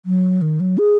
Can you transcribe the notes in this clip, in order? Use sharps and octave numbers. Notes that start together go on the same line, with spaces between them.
F#3
D#3
F#3
G#4